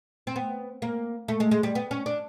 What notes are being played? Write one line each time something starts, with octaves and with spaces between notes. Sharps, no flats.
C4
B3
A#3
A3
G#3
G#3
G3
B3
C#4
D4